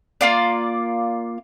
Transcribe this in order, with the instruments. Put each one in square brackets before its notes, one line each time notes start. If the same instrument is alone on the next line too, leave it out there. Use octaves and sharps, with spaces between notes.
[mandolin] A#3 F4 D5